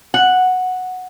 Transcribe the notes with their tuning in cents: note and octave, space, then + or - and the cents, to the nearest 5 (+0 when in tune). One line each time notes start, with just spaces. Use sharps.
F#5 -5